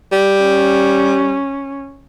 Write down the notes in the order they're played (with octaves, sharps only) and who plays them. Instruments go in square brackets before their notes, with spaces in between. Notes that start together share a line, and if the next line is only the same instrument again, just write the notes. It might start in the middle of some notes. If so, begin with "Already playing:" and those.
[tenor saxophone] G3
[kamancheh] C#4